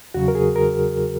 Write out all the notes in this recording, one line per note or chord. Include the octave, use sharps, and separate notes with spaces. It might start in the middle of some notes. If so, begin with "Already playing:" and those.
E2 C#3 F#3 F#4
A#4
G#4
A#4